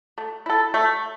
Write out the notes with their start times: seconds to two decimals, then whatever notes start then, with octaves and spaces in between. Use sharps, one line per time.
0.18 A3
0.46 E4 A4
0.74 A3